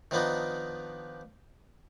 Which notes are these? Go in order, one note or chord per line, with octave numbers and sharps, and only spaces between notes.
D#3 F3 B3 D4 D#4